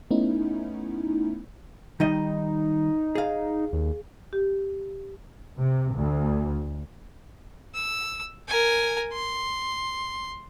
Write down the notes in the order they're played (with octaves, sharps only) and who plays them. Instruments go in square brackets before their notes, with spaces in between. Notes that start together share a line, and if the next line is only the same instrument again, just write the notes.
[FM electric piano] A3 B3 C#4 D#4 E4
[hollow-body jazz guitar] D#3 G3 D#5 [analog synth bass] D#4
[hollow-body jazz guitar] G#4 F5
[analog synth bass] D#2
[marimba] G4
[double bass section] C3
D2
[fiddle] E6
A#4 G#5
C6